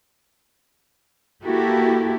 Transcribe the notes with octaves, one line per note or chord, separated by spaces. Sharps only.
A#3 E4 F#4 G4 A4